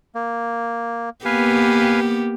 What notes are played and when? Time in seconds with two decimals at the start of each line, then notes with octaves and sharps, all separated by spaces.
0.15 A#3
1.25 A#3 B3 G4 B4 F5 G#5